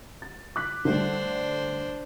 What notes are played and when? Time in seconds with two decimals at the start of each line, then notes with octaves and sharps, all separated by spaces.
0.22 A6
0.56 D6 F#6 B6
0.85 D3 G3 A3 D4 C5